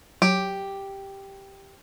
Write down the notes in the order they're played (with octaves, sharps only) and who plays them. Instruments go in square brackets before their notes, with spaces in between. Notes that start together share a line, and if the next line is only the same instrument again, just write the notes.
[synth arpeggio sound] F#3 [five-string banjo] G4